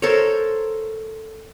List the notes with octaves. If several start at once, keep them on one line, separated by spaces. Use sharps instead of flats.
A4 A#4 C5 C#5